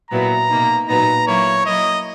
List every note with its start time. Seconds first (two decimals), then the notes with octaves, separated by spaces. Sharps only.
0.11 A#2 F#3 B3 E4 A#5
0.50 B2 A#3 D#4
0.88 A#2 F#3 B3 D#4 A#5
1.27 F#3 A#3 E4 C#5
1.65 F#3 A#3 E4 D#5